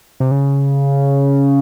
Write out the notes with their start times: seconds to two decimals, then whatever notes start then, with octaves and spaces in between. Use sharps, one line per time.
0.20 C3
0.31 C#3